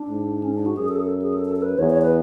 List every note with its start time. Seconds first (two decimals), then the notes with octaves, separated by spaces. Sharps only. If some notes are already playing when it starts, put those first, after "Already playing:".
Already playing: D4
0.09 G#2
0.43 C#4
0.54 D4
0.66 F#4
0.77 F#2 G#4
0.89 A4
0.95 G#4
1.00 A4
1.22 G#4
1.34 A4
1.45 A4
1.56 A4
1.62 B4
1.78 E2 C#5
1.90 C#5
2.01 B4